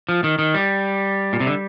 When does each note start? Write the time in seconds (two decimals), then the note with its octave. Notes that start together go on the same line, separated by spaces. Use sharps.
0.09 F3
0.24 D#3
0.39 D#3
0.54 G3
1.33 A#2
1.40 C3
1.47 D3